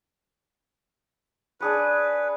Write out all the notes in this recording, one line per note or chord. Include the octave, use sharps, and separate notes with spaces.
D4 G#4 B4 C#5